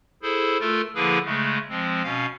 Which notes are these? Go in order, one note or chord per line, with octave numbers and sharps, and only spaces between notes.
E4 G#4 A4 C5
A3 F4 A4 A#4
D3 F3 A#3 E4 G#4 B4
C#3 G#3 A3
F3 G#3 C4
B2 C#4 F5